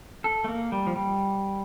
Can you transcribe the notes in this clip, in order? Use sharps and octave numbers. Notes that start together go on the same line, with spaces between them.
A4
A3
A#3
G3
F3
G3